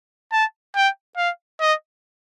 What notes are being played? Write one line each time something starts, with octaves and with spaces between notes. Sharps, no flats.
A5
G5
F5
D#5